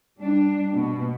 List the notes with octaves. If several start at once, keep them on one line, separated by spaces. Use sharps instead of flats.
G3 D4
B2